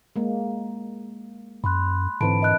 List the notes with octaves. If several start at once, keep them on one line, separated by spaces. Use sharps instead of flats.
G#3 A#3
F#2 B5 C6 F#6
G#2 D3 E3 C4 A5 B5 D7
A#4 D#5 F#6